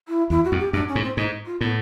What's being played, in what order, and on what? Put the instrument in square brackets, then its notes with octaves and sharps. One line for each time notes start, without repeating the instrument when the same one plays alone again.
[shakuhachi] E4
[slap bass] E2 [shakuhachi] E4
[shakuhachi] F#4
[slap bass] F2
[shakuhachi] G4
[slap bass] F#2 [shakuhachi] D4
[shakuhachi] C#4
[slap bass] G#2
[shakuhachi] C4
[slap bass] G#2 [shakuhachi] D#4
[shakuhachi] F4
[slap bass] A2 [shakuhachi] B3